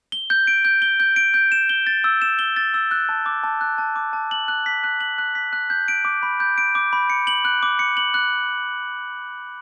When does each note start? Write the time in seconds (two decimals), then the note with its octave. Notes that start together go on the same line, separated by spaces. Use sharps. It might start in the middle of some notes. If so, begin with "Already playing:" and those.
0.12 G7
0.30 G6
0.47 D7
0.65 G6
0.82 G7
1.00 G6
1.16 D7
1.34 G6
1.52 E7
1.69 G7
1.87 A6
2.04 E6
2.22 E7
2.39 G7
2.56 A6
2.74 E6
2.91 F#6
3.09 A5
3.26 D6
3.44 A5
3.61 F#6
3.78 A5
3.96 D6
4.13 A5
4.31 F#7
4.48 F#6
4.66 B6
4.84 F#6
5.01 F#7
5.18 F#6
5.35 B6
5.53 F#6
5.70 G6
5.88 D7
6.05 D6
6.23 B5
6.40 G6
6.58 D7
6.75 D6
6.93 B5
7.10 C#7
7.27 F#7
7.45 F#6
7.63 D6
7.79 C#7
7.97 F#7
8.14 F#6